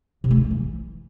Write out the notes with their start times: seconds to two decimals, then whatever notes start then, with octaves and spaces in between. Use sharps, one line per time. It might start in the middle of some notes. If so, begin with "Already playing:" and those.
0.24 C3
0.31 A3
0.37 D#4
0.44 A3
0.51 E3